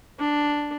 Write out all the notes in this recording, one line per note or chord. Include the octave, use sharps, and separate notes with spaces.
D4